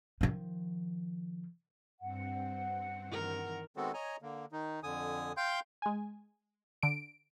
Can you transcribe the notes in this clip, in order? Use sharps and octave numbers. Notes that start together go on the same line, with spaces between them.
D#3 F3
G2 C4 F#5
D#3 E3 A#4
D#3 G#3 B3 C4 F#4 A4
C#5 D#5 G#5 A#5
D3 A#3
D#3 D#4
F2 D3 G#5 D#6
F5 G5 C6 G6
G#3 G#5
D3 D7